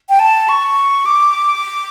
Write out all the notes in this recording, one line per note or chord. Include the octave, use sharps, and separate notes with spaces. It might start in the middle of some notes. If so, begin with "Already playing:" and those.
G5
A5
C#6
D6